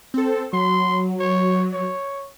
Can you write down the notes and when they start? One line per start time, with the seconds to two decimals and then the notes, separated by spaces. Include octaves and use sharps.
0.14 C4 A4
0.53 F#3 C6
1.19 C#5
1.72 C#5